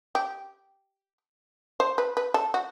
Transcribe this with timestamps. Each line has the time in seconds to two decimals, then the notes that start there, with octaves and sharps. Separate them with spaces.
0.15 G4
1.80 C5
1.98 B4
2.17 B4
2.34 A4
2.54 F#4